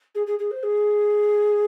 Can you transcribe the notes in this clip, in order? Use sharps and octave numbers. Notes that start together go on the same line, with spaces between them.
G#4
G#4
G#4
C5
G#4